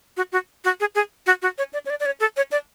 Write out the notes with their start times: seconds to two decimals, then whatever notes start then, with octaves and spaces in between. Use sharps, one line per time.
0.17 F#4
0.32 F#4
0.65 F#4
0.80 G#4
0.95 G#4
1.26 F#4
1.42 F#4
1.58 C#5
1.73 D5
1.86 C#5
1.90 D5
2.00 D5
2.06 C#5
2.20 A4
2.37 C#5
2.52 D5